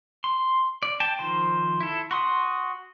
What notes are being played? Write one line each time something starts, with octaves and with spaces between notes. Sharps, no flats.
C6
D5
G5 A5
D#3 F3 C5
E4 A4
F#4 C6 D#6